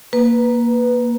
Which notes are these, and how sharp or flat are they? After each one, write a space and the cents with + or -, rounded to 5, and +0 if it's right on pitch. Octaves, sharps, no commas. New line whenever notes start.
A#3 +5 B4 +0